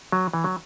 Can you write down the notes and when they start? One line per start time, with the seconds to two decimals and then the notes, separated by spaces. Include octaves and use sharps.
0.12 F#3
0.33 E3
0.44 F#3